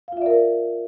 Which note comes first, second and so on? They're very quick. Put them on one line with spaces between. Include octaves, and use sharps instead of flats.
F5 F4 E5 D5 A#4